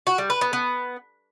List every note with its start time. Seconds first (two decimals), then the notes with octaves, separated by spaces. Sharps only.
0.07 F#4
0.18 G3
0.30 B4
0.41 B3
0.53 B3